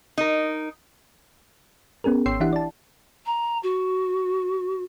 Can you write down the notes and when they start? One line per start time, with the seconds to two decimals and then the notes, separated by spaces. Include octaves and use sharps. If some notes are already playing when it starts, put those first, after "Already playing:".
0.18 D#4 A#4
2.04 B3 C#4 G#4 A#4
2.26 G#1 C#5 G5 C6 E6 C7
2.40 E3 D4 E4 G4 E5 F#5
2.53 D5 A5
3.26 A#5
3.63 F#4